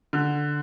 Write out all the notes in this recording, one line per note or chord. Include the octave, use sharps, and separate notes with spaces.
D3